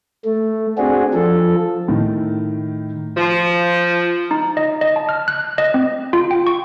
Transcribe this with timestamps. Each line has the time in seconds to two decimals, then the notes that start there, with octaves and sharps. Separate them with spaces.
0.25 A3
0.78 C4 D4 F#4 G#4
1.14 F3 A4
1.88 A2 D#3
3.16 F3
4.31 D#4
4.57 D#5
4.81 D#5
4.96 A5
5.09 F6
5.28 F#6
5.58 D#5
5.74 C4
6.13 F4
6.31 G5
6.47 C#6